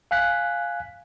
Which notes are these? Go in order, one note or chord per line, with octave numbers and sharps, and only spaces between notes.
F5 G#5 F#6 B6